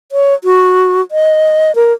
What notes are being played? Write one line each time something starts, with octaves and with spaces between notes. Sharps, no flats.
C#5
F#4
D#5
A#4